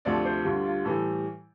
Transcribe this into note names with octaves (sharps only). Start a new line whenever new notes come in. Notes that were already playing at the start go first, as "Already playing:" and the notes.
D2 C3 F3 A3 D5
C5
D2 D3 G3 F4
F4
A2 E3 G3 A4